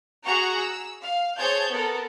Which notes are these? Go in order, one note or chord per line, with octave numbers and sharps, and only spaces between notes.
F#4 G#4 F#5 A#5 C#6
E6
F5
G#4 C5 C#5 A5 G6 G#6
B3 A4 A#4